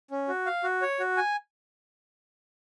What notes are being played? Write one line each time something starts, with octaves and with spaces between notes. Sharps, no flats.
C#4
F#4
F5
F#4
C#5
F#4
G#5